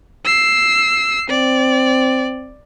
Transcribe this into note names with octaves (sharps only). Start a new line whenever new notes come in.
E6 C7
C4 D5